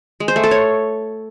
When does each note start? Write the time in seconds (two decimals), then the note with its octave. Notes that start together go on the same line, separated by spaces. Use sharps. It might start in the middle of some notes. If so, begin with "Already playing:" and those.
0.20 G#3
0.28 C5
0.36 A3
0.44 A4
0.51 C#5